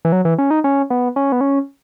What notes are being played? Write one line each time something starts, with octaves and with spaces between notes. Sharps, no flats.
E3
F#3
E3
C#4
D#4
C#4
B3
C#4
B3
C#4